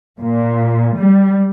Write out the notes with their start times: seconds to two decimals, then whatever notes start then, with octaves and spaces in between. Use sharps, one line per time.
0.19 A#2
0.98 G3